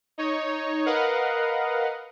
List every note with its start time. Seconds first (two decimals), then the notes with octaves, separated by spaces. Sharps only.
0.18 D#4 C#5
0.86 A#4 B4 D#5 F5 F#5